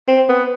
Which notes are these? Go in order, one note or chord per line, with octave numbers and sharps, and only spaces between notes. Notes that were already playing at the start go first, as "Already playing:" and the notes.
C4
B3